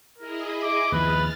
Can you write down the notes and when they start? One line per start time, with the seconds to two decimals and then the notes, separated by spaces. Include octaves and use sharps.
0.18 E4 G#4 A#4 D#5
0.63 D6
0.92 D#2 F3 B4 F6 A6